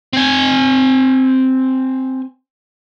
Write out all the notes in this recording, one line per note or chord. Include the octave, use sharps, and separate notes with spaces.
C4 G#5